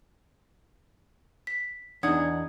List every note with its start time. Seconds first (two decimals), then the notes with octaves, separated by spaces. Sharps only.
1.47 B6
2.03 E2 D4 D#4 F#5 D#6 G#6